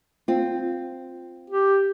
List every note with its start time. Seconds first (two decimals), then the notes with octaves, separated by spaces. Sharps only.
0.28 C4 F4
1.50 G4